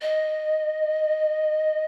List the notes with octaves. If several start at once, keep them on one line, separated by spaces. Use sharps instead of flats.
D#5